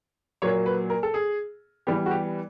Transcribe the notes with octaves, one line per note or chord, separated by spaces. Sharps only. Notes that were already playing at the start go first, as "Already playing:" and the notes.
A#2 F#3 A#3 C#5
B4
A#4
A4
G#4
E3 G3 B3 G4
F#4
G4